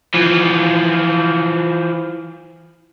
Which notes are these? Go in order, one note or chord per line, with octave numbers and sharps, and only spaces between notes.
E3 F3